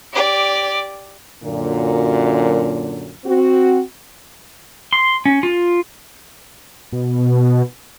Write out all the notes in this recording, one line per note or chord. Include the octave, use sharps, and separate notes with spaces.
G4 D5
F#2 A#2 D3
C4 F#4
C6
C#4
F4
B2